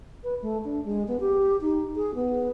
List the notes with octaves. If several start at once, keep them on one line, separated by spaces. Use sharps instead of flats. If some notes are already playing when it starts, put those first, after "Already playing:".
B4
A3
D4
G#3
B3
G4
D#4
G#4
B3